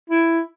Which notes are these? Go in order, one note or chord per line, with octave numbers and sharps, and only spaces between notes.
E4